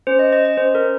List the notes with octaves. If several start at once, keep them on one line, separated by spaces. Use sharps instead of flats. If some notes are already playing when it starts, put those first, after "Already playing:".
C#4 C5
D#5
C#4 D#5
D#5
C#4 C5
A#4
C#4